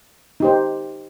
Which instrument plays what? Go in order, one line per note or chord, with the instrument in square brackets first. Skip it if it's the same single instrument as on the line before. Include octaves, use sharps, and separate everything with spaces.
[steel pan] D#4 G4 C5